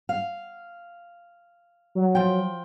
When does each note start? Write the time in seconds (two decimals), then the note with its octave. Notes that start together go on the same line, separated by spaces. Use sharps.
0.09 F5
1.95 F#3
2.15 F3 G5